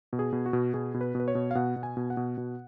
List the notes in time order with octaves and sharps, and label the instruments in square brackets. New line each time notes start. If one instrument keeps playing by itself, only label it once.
[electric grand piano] B2
G#4
B2
F#4
B2
B2 G#4
B2
B4
B2 B4
C#5
B2
F5
B2 F#5
B2
G#5
B2
F#5
B2
B2